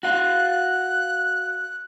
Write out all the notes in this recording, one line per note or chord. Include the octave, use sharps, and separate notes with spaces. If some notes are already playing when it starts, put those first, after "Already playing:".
F#4 F5 F#6